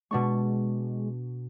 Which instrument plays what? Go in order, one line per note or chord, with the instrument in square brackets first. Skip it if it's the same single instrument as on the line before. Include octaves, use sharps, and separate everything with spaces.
[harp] B2 D4 C#6 [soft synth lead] G#3